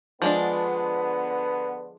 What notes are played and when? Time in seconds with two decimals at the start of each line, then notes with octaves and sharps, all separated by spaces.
0.22 D3 F3 G#3 B3 D4